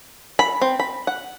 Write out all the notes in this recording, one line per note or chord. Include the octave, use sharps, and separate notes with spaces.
B5
C4
B5
F#5